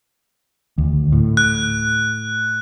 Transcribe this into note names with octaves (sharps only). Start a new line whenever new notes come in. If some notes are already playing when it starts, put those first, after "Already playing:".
D2
A2
F#6